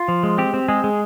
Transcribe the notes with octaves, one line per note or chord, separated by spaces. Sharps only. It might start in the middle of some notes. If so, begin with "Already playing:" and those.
Already playing: F4
F3
G#3
C4 G4
C4
G#3 G#4
G#3